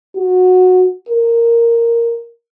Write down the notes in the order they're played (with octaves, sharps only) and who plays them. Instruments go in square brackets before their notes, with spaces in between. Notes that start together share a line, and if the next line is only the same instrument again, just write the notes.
[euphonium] F#4
A#4